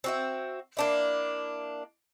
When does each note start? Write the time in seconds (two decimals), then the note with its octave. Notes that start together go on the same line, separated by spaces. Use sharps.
0.04 C4 F#4 E5
0.77 A#3 D4 E4